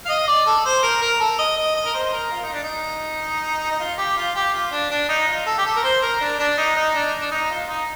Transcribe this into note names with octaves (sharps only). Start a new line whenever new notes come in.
F5
D#5
D5
A4
C5
A#4
A#4
A4
D#5
D#5
D#5
A#4
C5
A#4
F4
D#4
D4
D#4
D#4
F4
G4
F4
G4
F4
D4
D4
D#4
F4
A4
G4
A4
A#4
C5
A#4
D4
D4
D#4
D#4
D4
D4
D#4
F4
D#4